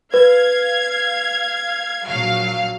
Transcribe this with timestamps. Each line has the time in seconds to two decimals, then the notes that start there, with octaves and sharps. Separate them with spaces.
0.14 B4 F5 G#6
2.07 A#1 F#3 F5